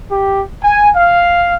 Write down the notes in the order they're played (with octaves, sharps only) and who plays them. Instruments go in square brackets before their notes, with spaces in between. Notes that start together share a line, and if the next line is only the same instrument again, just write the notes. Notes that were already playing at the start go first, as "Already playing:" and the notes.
[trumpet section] G4
G#5
F5